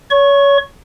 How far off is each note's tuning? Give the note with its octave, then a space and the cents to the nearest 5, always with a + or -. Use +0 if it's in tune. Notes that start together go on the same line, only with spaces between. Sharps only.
C#5 +25 C#6 -10